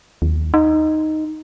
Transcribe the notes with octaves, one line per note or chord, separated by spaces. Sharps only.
D#2
D#4